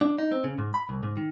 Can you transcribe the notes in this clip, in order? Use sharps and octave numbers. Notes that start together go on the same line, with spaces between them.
D4
D#4
C4
C#3
G#2
B5
C2
G#2
D#3